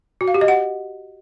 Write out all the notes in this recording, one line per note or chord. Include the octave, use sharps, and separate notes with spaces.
F#4
F5
G4
D#5
F#5